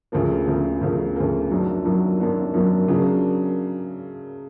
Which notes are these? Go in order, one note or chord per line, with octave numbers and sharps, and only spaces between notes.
D2 C#3 F3 A#3
D2 C#3 F3 A#3
D2 C#3 F3 A#3
D2 C#3 F3 A#3
F#2 D#3 F#3 A#3 D4
F#2 D#3 F#3 A#3 D4
F#2 D#3 F#3 A#3 D4
F#2 D#3 F#3 A#3 D4
C#3 F#3 A#3 D4